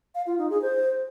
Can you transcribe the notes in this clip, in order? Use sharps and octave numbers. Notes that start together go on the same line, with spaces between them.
F5
F4
D#4
G#4
C5